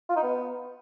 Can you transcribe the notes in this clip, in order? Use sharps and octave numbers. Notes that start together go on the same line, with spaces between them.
F4
D#4
B3